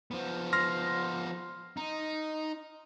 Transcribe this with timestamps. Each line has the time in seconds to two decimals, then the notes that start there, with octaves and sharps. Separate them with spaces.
0.11 F3 B3
0.53 C6 F6 A#6
1.77 D#4